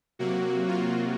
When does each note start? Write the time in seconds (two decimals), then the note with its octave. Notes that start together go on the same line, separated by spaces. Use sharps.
0.19 C3 F#3 A#3 F#4
0.68 F4